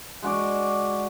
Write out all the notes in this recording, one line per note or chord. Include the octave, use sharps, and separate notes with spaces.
G#3 F#4 D5